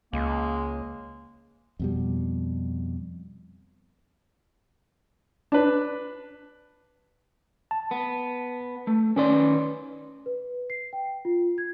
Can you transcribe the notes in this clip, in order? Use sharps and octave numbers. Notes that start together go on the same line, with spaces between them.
C#2 G#3 A#3
F2 B2 G3
D4 B4
A5
B3
A3
D#3 C#4 B4 D5 C6
B4
C7
G5
F4
G#6